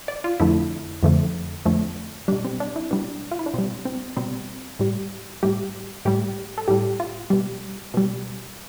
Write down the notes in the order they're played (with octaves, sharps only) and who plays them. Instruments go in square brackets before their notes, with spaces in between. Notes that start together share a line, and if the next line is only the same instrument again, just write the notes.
[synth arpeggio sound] D5
F4
F2 D3 F3 A3 E4
F2 D3 F3 A3
F2 D3 F3 A3
B2 G3 D4
C4
D4
E4
B2 G3 D4
F4
E4
D4
B2 G3 C4
C4
B2 G3 C4
A2 G3
A2 G3 G4
A2 G3 G4
A4
A2 G3 G4
F4
B2 G3
B2 G3